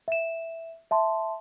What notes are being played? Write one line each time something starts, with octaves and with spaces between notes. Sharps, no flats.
E5 E7
E5 A5 C6